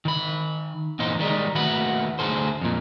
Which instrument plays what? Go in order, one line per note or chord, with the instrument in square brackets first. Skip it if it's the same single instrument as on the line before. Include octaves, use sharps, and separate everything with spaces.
[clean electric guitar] D#3 B5
E2 A#2 D#4 C5
D#3 G3 G#3 D#4
D#2 A3 F#4 B4 F#5 B5
D2 B2 G#4 A4 C5
F2 A#2